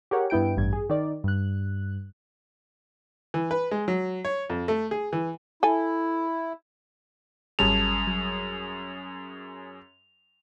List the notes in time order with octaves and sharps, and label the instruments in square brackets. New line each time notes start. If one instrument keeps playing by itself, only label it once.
[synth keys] G4 G#4 A#4 C#5 F#5
G2 B3 E4 G5 D7
A1 G2 G3 G#6
G#4
D#3 D5
G2 F#6
[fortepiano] E3
B4
G#3
F#3
C#5
F2
A3
G#4
E3
[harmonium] E4 [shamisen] A4 G#5
[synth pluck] G#1 G3 A5 [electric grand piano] F#2 C#4 G#4 [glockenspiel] F7
[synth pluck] F#3